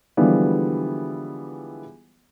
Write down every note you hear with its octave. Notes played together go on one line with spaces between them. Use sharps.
D3 E3 F3 G3 G#3 B3